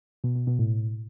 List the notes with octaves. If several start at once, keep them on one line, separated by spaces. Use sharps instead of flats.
B2
B2
B2
A2